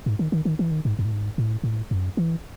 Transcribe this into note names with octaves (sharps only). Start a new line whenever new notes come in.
G#2
D#3
D#3
D#3
E3
D#3
G#2
F#2
A2
G#2
A2
A2
F#2
E3